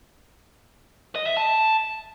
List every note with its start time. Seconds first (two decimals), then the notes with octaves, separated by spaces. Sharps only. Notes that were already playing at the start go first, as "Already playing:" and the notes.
1.16 D#5
1.26 E5
1.37 A5